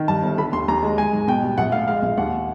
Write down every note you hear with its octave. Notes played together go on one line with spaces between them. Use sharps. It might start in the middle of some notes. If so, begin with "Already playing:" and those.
Already playing: D#3
G2 A5
G1
D3 B5
D#2 C6
D#2 A#5
G#3
G#3 G#5
G#2
B2 G5
G3
A#1 F#5
A2 F5
G#3 F5
A#1
D#2 F#5